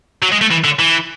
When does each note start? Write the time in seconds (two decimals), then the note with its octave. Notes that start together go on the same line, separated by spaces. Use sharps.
0.23 F#3
0.32 G#3
0.41 A3
0.51 E3
0.64 D3
0.79 E3